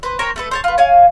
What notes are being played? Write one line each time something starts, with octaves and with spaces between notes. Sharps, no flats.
B4 C5
A#4 C5 C#5 G5
A3 A4 B4
C5 C#5 A5
F4 B4
C#5 F5 G#5